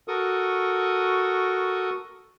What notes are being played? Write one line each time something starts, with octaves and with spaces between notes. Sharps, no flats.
F#4 A4 A#4 C#6 D#6